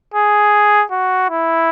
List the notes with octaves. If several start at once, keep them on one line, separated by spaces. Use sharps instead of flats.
G#4
F#4
E4